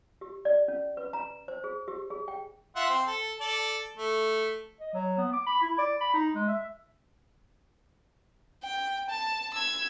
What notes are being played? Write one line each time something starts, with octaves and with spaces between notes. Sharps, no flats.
G4
D5
C#4
B4
A#5
C5
G#4
G4
G#4
G5
F4 E5 F#5
C4
A4
A4 D5
A3
D#5
F#3
B3
D6
B5
E4
D5
B5
D#4
G#3
E5
G5
A5
E6 G#6